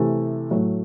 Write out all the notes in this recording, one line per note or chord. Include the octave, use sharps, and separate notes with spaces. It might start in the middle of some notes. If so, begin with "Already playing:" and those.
Already playing: C3 E3 A3
A2 F#3 A3